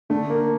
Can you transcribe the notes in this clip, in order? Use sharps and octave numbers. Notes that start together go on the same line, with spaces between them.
D3 A3
A#3